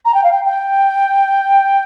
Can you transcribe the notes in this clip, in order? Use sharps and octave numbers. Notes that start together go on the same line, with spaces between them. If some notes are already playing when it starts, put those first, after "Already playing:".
A#5
G5
F5
G5
G5